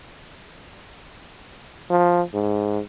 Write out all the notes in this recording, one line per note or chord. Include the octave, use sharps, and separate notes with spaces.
F3
G#2